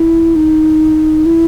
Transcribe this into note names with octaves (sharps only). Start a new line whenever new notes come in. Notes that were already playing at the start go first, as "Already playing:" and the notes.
Already playing: E4
D#4
E4